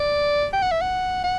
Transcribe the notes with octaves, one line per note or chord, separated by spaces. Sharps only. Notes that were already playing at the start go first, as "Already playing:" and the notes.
Already playing: D5
G5
F#5
E5
F#5
F#5